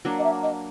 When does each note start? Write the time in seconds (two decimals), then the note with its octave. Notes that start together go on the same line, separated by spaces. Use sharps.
0.05 F#3 A#3 D4
0.18 D#5
0.24 E5
0.43 D#5